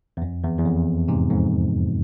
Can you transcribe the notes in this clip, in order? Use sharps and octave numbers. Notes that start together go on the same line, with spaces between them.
E2
F2
E2
E2
F2
G#2 C3
F2 G#2